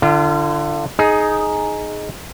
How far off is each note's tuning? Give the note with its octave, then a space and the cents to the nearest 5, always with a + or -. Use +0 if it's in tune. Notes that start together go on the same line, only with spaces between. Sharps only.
D3 +25 F4 -30
D#4 +0 G#4 +15